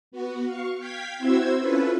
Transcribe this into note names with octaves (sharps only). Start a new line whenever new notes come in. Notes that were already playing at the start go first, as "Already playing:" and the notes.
B3 F#4
F5 C#6
F5 G5 G#6 B6
C4 E4 F#4 C5 E6 G#6
C#4 E4 F4 A4 B4